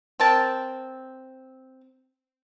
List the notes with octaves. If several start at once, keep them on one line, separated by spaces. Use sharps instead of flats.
C4 A#4 A5